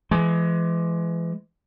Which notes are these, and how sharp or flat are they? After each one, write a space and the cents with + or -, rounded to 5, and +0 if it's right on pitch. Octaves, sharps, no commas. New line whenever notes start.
E3 +35 G#3 +25